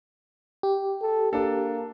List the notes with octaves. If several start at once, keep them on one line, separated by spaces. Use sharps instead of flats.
G4
A4
A#3 D4 A4